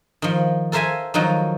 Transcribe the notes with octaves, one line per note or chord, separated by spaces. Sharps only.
D#3 F3
A4 A#4 C5 E5 F5 G#5
D#3 F3 F#3 D#4